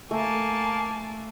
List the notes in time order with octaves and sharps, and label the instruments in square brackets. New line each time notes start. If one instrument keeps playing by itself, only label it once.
[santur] A3 [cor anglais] A#3 [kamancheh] G#5 A5